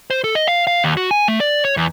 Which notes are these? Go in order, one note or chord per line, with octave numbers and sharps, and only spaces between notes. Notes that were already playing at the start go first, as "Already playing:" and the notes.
C5
A4
D#5
F5
F5
D#2
F#4
G#5
A3
D5
C#5
E2